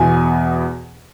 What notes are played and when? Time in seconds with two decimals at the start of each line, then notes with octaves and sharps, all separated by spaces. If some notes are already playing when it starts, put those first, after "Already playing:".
Already playing: E2 B2 G#5